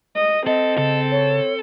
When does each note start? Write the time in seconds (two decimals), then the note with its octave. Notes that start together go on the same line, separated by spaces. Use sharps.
0.15 D#5
0.47 C4 A4 D#5
0.78 C#3 A4
1.11 C#5